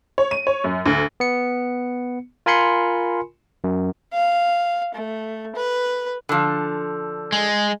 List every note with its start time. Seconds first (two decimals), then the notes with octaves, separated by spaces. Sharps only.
0.18 C#5
0.31 D#7
0.47 C#5
0.64 F#2
0.86 D2
1.20 B3 C#7
2.46 F4 A#4 G#5 B5 C6 C#7
3.64 F#2
4.14 F5
4.94 A3
5.56 B4
6.29 D3 F3
7.32 G#3